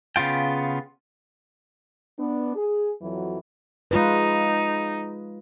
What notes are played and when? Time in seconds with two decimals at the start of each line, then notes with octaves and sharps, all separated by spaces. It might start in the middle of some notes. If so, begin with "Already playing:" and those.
0.16 C#3 B3 F4 G5
2.19 B3 D4
2.56 G#4
3.01 F2 E3 F#3
3.91 G#3 D#4 F4 B4